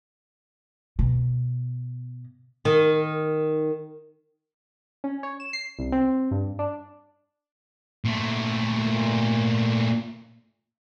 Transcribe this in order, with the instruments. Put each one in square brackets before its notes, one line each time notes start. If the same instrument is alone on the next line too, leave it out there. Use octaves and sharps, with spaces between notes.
[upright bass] B2
[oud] D#3
[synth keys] C#4
C#5
E7
C7
C2
C4
G2
D4
[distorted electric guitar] A#2 A3